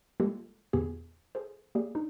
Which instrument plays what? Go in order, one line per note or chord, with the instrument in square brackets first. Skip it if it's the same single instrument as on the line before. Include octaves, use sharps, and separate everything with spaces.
[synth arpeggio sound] G3 G#3 A#3 F4 G4 A4
E2 A#2 D3 B3 G4 G#4
G#4 A4 C5
A#3 G4 G#4 D5
D4 D#4